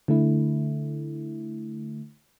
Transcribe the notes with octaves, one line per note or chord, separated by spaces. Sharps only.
D3 A3 E4